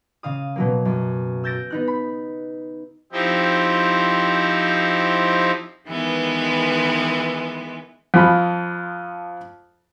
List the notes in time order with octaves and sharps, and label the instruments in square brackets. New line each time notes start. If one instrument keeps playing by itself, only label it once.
[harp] C#3 F5 D#6
B2 F#3 A#3
F#2
E6 G6 A6 A#6 D7
B3 D#4 F#6
B5
[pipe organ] F3 C4 D#4 E4 G4
[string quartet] D#3 E3 G#3 B3
[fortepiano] F2 F3 B5